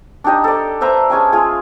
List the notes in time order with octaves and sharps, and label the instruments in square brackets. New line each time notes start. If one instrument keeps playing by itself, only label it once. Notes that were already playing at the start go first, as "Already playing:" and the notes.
[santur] D4 D#4 G4 D#5
A4 D5
B4 C5 E5 A#5
G#3 C#4 G#5 A5
F4 G#4